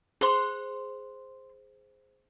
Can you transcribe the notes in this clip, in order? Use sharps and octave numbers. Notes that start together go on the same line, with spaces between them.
G#4 C5 C6 F#6